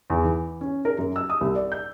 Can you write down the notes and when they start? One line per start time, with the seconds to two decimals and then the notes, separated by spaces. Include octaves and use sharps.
0.10 E2
0.24 E3
0.61 C#4
0.85 A#4
0.98 F#2
1.16 E6
1.30 D#6
1.41 C2
1.55 D5
1.72 G6